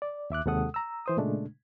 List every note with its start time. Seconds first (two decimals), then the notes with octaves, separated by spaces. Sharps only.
0.02 D5
0.30 D#2 E5 D6 F#6
0.45 D#2 C3 G#3 A4 F#5 D#6
0.74 A#5 E6
1.06 E3 C5 D#6
1.17 A#2 C#3 G#3 A3 D4